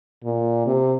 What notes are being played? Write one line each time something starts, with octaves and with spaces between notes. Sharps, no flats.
A#2
C3